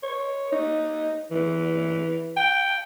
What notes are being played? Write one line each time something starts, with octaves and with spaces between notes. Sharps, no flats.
C#5
D#4
E3
G5